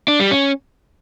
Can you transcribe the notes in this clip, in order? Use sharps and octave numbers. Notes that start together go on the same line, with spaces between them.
D4
G3
C#4